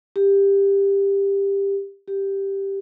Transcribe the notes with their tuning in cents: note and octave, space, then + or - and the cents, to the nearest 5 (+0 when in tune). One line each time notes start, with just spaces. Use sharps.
G4 +15
G4 +0